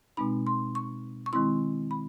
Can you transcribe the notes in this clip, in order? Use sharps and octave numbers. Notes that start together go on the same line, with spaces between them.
B2 G#3 C4 D#4 B5
C6
C#6
C#6
D#3 G#3 C4 E4 C6
B5